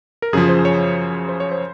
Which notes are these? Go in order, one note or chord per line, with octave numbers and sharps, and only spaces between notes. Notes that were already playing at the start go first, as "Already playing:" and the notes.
A#4
F#2 C#3 F3 G#4
C5
C#5
C5
C#5
C5